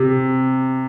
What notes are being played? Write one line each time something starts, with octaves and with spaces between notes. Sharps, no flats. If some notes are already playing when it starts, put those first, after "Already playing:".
Already playing: C3